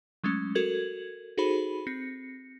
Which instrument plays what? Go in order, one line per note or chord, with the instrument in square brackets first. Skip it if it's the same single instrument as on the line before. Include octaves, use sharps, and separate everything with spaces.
[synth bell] F#3 G#3 A3 C#4
F#4 A4 A#4 G#6 F#7
D#4 F#4 G#4 A4 C5 B5
C4 A#6 C#7